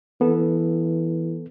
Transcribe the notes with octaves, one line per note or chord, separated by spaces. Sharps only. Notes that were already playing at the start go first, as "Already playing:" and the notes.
E3 B3 A4